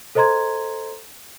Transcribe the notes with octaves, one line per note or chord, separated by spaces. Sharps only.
A4 C5 D#5 A#5 C6 G#6